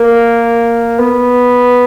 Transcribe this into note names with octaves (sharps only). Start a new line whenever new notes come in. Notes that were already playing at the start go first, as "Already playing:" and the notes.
Already playing: A#3
B3